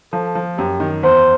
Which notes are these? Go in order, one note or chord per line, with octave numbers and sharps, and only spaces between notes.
F3 A4
F3
F#2 G4
D#3
E2 C5